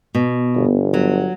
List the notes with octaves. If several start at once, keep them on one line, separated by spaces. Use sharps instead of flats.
B2
G1
F#3